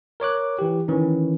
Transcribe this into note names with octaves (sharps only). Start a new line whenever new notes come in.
A#4 C#5 D6 F#6
E3 G4
D#3 E3 C#4